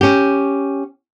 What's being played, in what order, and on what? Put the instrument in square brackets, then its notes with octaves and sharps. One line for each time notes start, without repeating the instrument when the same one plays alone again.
[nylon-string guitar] C#4 G4